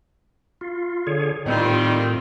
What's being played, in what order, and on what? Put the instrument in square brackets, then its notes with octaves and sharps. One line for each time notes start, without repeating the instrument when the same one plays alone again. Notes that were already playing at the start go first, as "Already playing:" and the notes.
[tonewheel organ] F4
D3 G#4 C#5
[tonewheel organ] A2 [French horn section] D#3 G3 [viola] C4 F4